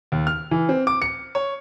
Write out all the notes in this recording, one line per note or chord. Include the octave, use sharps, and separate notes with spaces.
D#2
F6
E3
C4
D6
C#7
C#5